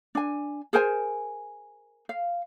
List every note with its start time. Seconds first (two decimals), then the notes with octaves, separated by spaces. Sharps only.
0.15 D4 G#5
0.73 G#4 A#4 C5 G#5
2.09 F5